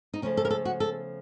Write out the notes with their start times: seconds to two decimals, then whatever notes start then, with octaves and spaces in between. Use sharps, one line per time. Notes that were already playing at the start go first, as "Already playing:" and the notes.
0.14 D#4
0.22 C#3 F3 A3 C#4
0.37 A4
0.45 A#4
0.51 A4
0.65 F#4
0.80 A4